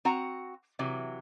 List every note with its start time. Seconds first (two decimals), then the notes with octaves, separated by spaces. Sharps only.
0.05 C4 F#4 F#5 A#5
0.79 C3 E3 F#3